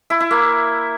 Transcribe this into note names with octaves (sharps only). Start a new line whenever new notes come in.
E4
E4
A#3